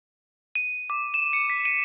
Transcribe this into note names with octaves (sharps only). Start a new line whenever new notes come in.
D#7
D6
E7
C#7
B6
D#7